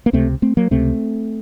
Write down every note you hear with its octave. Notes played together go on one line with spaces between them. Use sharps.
A#3
C#2 C3 A3 C4
A3 C4
F#3 A#3
C#2 C3 A3 C4